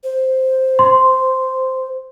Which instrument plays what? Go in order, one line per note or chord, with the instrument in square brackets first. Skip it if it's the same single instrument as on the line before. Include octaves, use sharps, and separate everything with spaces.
[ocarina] C5
[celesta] C6